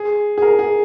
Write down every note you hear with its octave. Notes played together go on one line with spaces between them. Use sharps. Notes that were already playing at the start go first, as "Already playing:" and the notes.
Already playing: G#4
G#4
A#4
G#4